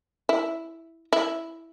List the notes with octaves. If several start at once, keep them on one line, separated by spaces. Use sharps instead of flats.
E4
E4